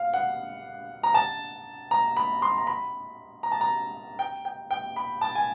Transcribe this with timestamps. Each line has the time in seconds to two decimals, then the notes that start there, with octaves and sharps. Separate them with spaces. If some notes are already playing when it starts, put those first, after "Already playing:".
Already playing: F5
0.14 F#5
1.03 A#5
1.14 A5
1.91 A#5
2.17 B5
2.42 C6
2.58 A#5
2.67 B5
3.43 A#5
3.52 A5
3.61 A#5
4.19 G5
4.45 G5
4.71 G5
4.96 B5
5.21 A5
5.35 G#5